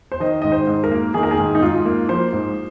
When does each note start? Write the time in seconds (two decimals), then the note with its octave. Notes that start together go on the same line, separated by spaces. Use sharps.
0.12 C5
0.20 D#3 D#5
0.42 G#2 D#5
0.52 C5
0.67 G#2
0.84 A#4
0.92 A#3
1.14 D#3 G#4
1.23 A#4
1.31 G#4
1.39 G#2
1.55 D#4
1.61 G#2 F4
1.85 A#3
2.09 F3 C5
2.33 G#2